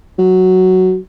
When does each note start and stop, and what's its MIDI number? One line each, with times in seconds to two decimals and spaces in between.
0.18 0.97 54